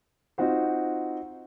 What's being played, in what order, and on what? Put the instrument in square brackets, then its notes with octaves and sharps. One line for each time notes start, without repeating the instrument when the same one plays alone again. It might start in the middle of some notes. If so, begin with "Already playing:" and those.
[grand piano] C4 D#4 F4 F#4 C5